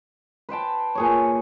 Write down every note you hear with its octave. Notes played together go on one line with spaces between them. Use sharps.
B4 C5 G5 A5
A#2 G#4 C#5